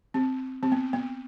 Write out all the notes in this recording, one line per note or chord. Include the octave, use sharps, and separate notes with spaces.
C4
C4
B3
B3